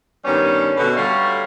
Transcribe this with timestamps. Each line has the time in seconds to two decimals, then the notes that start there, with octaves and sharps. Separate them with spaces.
0.25 G2 D#3 G3 B3 C#4
0.77 B2 D3
0.96 D3 G3 A3 F#4 C#5 F5